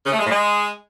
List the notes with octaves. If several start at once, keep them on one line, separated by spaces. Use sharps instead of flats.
C#3
A3
G#3
A2
G#3